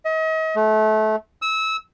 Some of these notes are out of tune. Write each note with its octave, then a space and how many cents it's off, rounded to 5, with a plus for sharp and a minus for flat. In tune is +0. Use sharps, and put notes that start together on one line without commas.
D#5 +40
A3 -25
E6 -25